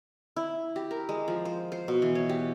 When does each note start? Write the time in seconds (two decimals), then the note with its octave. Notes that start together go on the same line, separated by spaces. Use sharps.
0.36 E4
0.76 G4
0.91 A#4
1.09 G#3
1.28 F3
1.45 C5
1.72 C5
1.88 B2
2.02 E3
2.15 C#5
2.29 G4